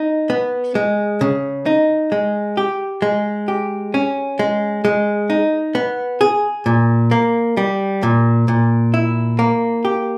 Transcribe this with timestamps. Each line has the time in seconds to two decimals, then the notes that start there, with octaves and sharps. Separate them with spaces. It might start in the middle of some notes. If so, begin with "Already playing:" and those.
Already playing: D#4
0.30 B3
0.75 G#3
1.21 C#3
1.66 D#4
2.12 G#3
2.57 G4
3.02 G#3
3.48 G4
3.94 C#4
4.39 G#3
4.85 G#3
5.30 D#4
5.75 B3
6.21 G#4
6.66 A#2
7.11 A#3
7.57 G3
8.03 A#2
8.48 A#2
8.94 E4
9.39 A#3
9.85 G4